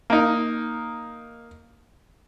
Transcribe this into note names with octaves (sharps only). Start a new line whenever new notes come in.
A#3 D#4